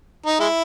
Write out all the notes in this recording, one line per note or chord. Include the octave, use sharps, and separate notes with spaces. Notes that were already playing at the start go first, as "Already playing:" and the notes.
D#4
G#3 E4